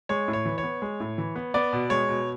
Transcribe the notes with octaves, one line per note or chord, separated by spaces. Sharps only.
G#3 C#5
A2
C#5
E3
C#5
B3
G#3
A2
E3
B3
B3 D5
B2
G#3 C#5
B2